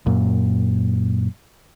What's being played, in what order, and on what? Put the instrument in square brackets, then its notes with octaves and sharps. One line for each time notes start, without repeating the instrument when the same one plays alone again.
[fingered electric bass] F#2 A#2